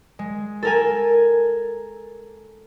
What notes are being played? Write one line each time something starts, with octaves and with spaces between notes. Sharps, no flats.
G#3
A4 A#4 G#5